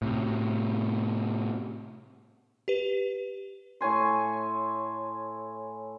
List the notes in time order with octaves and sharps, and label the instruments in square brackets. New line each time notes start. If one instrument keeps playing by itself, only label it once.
[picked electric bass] A2 C3
[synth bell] G4 B4
[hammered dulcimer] A2 C#5 G#5 C6